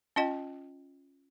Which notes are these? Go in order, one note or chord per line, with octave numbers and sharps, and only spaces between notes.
C#4 F4 D#5 G5